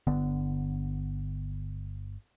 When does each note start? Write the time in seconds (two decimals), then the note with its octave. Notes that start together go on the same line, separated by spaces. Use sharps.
0.07 G1 D3 B3